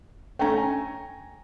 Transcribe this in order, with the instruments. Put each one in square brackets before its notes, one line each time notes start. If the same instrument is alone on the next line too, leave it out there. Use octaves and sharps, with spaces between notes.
[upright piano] A3 C#4 [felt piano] G5 A#5 C#6
[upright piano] G#5